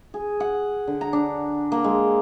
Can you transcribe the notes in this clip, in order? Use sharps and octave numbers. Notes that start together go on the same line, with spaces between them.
G#4
F#5
D3
A#5
D4
A#3
G#3